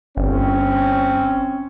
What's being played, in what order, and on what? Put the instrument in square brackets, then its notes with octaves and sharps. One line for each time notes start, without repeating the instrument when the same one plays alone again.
[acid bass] G1 [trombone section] C4 C#4